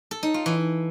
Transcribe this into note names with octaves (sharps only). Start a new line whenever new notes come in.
A4
D#4
F4
E3